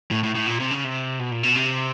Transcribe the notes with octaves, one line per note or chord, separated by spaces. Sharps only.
A2
A2
A2
A#2
C3
C#3
C3
B2
A#2
B2
C3